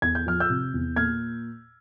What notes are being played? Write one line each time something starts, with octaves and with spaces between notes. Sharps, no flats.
E2 G#6
G6
F3 F6
E6 G6
C3
E2
A#2 F6 G#6